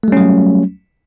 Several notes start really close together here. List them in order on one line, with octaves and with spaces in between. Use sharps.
A3 G3 C#4 F#3